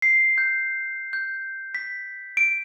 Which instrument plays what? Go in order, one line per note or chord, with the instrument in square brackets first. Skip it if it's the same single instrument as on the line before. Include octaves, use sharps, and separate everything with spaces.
[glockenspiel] C7
G6
G6
B6
D7